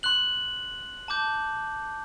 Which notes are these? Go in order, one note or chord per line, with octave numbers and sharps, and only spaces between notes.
C6 F#6 F#7
A5 D6 G6